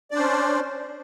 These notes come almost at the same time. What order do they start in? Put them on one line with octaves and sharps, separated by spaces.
D5 D4 C5 C#4